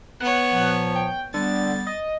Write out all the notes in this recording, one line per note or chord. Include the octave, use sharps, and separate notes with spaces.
B3 C#5 F#5
A#2 F3
G5
D3 G3 B3 A6
D#5